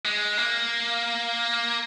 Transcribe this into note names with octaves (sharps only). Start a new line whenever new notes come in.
G#3
A#3